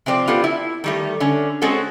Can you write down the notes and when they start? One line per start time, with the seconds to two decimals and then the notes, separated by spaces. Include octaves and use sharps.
0.06 C3 F3 C4 D5
0.27 B3 F4 G4 A4 D5
0.44 E4
0.84 D#3 G3 A3
1.20 D3 C#4
1.62 G#3 C4 C#4 F#4 A4